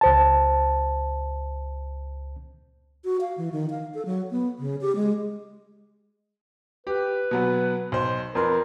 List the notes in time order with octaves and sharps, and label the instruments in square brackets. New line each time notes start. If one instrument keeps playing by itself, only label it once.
[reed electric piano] C#2 C5 A5
[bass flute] F#4
F5
E3
D#3
F5
A4
F#3
B3
C#3
G4
G#3
[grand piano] G4 [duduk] B4
[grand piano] B2 F#3 B3
B1 C5
[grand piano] F2 B4 C6 [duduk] A#4